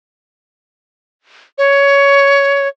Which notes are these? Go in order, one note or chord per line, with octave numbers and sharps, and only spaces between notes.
C#5